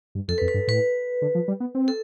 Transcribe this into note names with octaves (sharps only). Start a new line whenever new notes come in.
G2
F2 A4
B4
F2
B4
G2
A2 B4
D3
F3
G3
B3
C4
A4